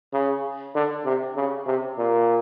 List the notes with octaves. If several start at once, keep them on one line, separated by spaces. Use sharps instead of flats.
C#3
D3
C3
C#3
C3
A#2